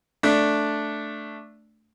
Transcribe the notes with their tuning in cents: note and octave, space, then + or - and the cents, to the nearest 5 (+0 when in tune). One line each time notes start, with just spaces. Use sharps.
A3 +0 D4 +0